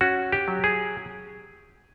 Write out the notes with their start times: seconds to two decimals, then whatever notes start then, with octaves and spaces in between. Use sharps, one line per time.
0.01 C#4 F#4
0.32 G4
0.48 F#3
0.64 G#4